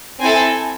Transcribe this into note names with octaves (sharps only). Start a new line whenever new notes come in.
C4 E4 A4 G#5